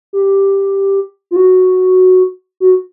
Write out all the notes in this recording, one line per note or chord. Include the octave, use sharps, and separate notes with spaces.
G4
F4
F#4
F#4